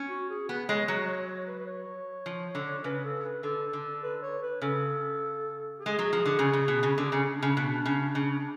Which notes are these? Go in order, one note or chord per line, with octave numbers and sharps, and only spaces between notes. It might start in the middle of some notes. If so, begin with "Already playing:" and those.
Already playing: C#4
F#4
G#4
B3 B4
G#3 C#5
F#3 C#5
C#5
C#5
B4
B4
C#5
F3
D3
C#3 B4
A4
B4
D3 A4
D3
B4
C#5
B4
C#3 A4
G#4
G#3
F#3
F3
D3
C#3
C#3
B2
C#3
D3 G#4
C#3
C#4
C#4
D4
C#3
B2
C#3
C#3